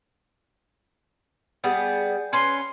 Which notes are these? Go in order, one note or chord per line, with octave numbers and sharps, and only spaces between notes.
G3 B3 G#4
C#4 B4 C6